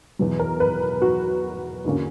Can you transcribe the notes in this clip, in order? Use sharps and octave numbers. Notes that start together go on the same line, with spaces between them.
E2 B2 F#3
A#4
B4
F#4
E2 D3 A#3 C#4